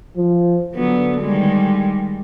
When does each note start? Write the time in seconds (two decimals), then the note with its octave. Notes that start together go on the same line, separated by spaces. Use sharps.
0.17 F3
0.75 D3 F#3 B3
1.22 D#3 G3 G#3